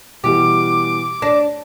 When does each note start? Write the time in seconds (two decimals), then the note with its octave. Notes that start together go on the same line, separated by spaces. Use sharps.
0.24 B2 E3 G3 G4 D6
1.22 D4 A#6